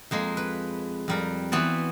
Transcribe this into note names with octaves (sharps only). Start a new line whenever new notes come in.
F2 G#3 A#3
B4
F2 G3 A#4
E3 B3 C4 F#4 D5